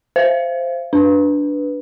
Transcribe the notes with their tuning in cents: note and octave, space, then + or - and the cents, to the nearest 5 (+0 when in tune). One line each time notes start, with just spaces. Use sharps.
C5 +0 F5 -30
D4 -5 B4 +0